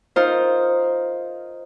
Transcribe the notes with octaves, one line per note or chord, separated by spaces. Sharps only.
D#4 F4 A#4 C5